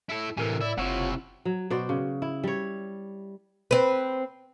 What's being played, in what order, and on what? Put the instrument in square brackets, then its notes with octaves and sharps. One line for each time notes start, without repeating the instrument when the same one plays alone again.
[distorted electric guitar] E4 A4
[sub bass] A2 [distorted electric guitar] C3 E3 [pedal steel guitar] A4 A#4 G#5
[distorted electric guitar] E4 [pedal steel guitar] D5
[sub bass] F#1 [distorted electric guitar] C3 E4 [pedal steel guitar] F4 C#5 F#5
[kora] F#3
B2 F#4 C5 D5
C#3
E4
G3 C#5
[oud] C4 B4